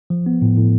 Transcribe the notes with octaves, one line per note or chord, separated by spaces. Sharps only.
F3
B3
A2
A2